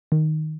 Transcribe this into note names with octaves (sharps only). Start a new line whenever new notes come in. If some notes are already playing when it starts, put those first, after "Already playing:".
D#3